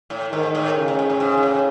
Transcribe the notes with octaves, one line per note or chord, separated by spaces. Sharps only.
A2
G#2 D#3
A2
C#3
A2
G#2
A2
G#2
G#2
A2